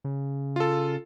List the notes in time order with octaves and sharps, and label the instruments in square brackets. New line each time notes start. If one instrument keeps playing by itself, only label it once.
[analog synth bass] C#3
[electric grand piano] F4 A4